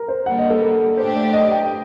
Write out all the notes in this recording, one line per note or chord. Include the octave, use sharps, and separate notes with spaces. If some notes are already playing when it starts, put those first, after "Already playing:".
Already playing: A#4
C5
D3 G3 A#3 F#5
D#5
A4
A#4
A2 A3 D4 G4 C5
D5
D#5
G5